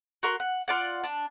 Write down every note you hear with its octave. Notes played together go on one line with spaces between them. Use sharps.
F#4 A#4 C6
F#5
F4 D5 F#5
D4